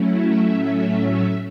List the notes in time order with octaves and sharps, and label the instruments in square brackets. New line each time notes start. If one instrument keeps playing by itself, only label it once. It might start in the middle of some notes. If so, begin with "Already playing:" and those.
Already playing: [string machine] F#3 A3 C#4 E4
E5
A2 F#3 A3 C#4